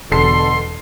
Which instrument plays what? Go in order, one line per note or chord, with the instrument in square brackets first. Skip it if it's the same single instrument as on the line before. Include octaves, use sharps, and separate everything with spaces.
[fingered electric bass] E1 [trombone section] B2 D3 [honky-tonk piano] A4 C7 [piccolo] C6